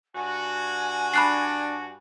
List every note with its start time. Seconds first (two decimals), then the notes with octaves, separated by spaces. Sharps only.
0.15 G2 F#4 G#5
1.14 D4 B5 F#6 C7